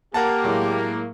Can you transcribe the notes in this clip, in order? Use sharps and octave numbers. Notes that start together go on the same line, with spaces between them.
A#3 G4 A#4 F#5 A5
A2 F#3 G#3